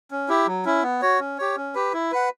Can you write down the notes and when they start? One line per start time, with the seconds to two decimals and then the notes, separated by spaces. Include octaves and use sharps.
0.11 C#4
0.29 E4 G4
0.47 F#3
0.65 C#4 E4
0.83 B3
1.02 F#4 C#5
1.20 C#4
1.38 G4 C#5
1.56 C#4
1.75 G4 B4
1.93 E4
2.12 B4 F#5